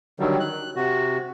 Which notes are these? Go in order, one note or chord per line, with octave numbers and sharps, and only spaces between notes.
D3 D#3 F#3 G3
F#6
C3 F#4